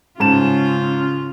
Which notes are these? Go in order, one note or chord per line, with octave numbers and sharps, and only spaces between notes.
G#2 C#3 C#4 F4 A5 E7